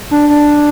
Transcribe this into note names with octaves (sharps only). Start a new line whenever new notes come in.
D4
D4